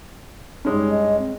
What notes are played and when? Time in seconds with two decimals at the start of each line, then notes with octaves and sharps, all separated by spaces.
0.65 G2 G#3 C#4 D#4
0.90 D#5
1.19 C4